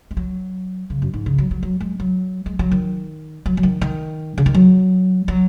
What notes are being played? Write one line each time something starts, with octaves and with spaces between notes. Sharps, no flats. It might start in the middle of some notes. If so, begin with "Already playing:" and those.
G#3
F#3
C#3
F#2
G#2
C#3
F#3
F#3
F#3
G#3
F#3
G#3
F#3
D#3
F#3
F#3
D#3
D#3
C#3
D#3
F#3
F#3